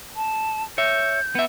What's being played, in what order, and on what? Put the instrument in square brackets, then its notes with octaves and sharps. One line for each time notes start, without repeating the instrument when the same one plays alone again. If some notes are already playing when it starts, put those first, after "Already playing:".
[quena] A5
[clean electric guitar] C#5 E5 [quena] G6
[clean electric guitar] B3 E5